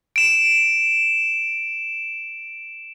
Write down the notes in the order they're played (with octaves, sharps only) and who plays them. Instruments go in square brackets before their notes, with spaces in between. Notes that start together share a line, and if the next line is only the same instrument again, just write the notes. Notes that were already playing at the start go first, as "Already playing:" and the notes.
[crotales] D7 E7